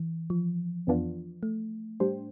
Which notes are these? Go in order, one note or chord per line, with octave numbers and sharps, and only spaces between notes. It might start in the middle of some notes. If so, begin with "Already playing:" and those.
Already playing: E3
F3
F2 E3 B3 D4 F4
A3
A2 G3 D4 G4 C5